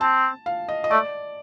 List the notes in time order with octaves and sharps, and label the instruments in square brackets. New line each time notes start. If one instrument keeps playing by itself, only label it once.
[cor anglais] C4 [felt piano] A5
[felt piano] F5
D#5
D#5
[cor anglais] A3 [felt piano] D5